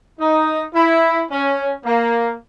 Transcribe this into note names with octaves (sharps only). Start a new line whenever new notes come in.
D#4
E4
C#4
A#3